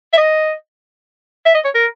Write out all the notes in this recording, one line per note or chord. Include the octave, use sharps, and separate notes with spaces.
E5
D#5
E5
D#5
C#5
A#4